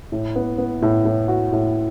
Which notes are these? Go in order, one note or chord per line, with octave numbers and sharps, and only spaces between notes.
A2
B3
B3
A2
A2
F#4
A2